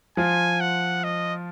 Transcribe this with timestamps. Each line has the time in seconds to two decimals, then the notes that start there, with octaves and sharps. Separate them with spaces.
0.17 F3 F4 G#5
0.61 F#5
1.04 D#5